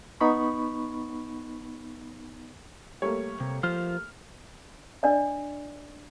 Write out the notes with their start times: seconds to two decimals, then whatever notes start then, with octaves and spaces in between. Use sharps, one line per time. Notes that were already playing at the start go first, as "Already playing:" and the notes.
0.21 B3 D#4 B5 C#6
3.02 G3 A3 A#3 C#5
3.40 C3
3.63 F3 F4 C5 F6
5.03 D4 D5 D#5